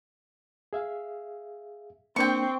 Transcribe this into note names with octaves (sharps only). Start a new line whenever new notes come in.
G#4 E5 F5
A#3 C4 D4 G5 C#6